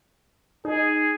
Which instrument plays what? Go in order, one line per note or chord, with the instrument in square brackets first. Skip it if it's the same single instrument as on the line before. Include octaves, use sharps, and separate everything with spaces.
[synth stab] D#4 [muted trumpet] G#4